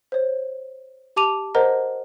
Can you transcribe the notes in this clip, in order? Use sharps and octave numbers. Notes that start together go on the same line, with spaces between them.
C5 C#5
G4 A5 D6 D#7 F7
A#4 C5 D#5 F#5 A#5